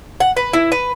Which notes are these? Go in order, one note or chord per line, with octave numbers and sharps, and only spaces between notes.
F#5
B4
E4
B4